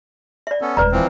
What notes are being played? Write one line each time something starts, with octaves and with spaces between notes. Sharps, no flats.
D5 E5
B3 C#4 A4
D#1 G#3 B4 D5 A#5
E3 F3 C4